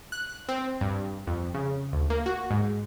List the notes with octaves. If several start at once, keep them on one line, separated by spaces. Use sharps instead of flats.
F#6
C4
G2
F2
C#3
D2
A#3
F#4
G#2